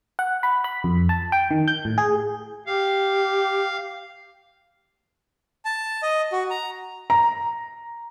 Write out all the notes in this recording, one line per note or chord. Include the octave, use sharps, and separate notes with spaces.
F#5
B5
B5
F2
A5
G5
D#3
G6
A2
G#4
G4 F5
A5
D#5
F#4
A#5
A#5